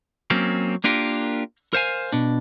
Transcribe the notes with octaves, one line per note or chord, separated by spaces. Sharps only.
F#3 A#3 C4 C#4
A#3 D4 F4 G4 A#4
A#4 C5 F5 G#5
B2 D4